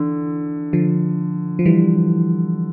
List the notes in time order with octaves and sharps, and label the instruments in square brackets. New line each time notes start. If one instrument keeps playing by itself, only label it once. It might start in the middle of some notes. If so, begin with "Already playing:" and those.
Already playing: [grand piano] D3 [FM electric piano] E3
[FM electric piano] D3 F3
F3
E3 G3